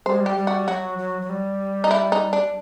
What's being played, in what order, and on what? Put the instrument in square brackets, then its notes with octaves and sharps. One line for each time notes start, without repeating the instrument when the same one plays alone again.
[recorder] G3 [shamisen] C5
[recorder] G#3
G3
[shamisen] G4
[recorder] G3
[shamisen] F#4
[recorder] F#3 [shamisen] F#4
[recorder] F#3
F#3
G3
[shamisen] D#4
E4
D#4
D4